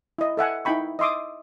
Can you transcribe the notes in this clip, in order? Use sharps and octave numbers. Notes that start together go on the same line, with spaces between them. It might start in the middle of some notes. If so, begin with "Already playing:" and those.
E4 D#5
A4 E5 F#5 G#5
D#4 E4 G5 B5 C#6
D#5 E5 C6 D6 D#6